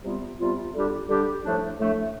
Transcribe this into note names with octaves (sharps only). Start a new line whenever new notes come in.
C3 G3 B3 F4
C3 G3 B3 F4
D3 G3 D4 G4
D3 G3 D4 G4
A2 F3 A3 D4
A2 F3 A3 D4